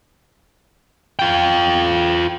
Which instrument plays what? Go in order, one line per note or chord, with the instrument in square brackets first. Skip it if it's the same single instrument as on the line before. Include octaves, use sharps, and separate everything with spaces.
[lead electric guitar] F4 G5